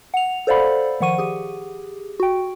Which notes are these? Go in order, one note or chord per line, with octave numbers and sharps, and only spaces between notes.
F#5 F7
A4 C5 D5 F5 F#5 B5
D#3 F3 F#5 C#6 D#7
G4 G#4
F#4 G5